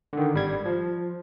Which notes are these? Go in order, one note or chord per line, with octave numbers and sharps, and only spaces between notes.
D3 D#3
G#1 G3 G#6
F3